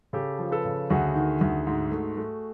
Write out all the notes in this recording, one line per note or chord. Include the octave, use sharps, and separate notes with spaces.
C#3 G4 A4
F3
A4 B4
C#3
D2 F#4 G#4
D#3
D2
G#2
A3
A3